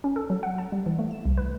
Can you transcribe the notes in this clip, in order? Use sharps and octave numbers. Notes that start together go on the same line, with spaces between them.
C#4
A4
F#3
F#5
A5
G3
E3
A3
E7
C2
B4